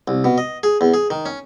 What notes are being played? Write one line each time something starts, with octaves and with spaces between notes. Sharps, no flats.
C2
B2
D#5
G#4
E2
G#4
D#3
C#4